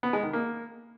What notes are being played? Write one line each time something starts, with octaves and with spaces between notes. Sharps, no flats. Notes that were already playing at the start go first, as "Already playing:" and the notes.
B3
G#3
D#3
A#3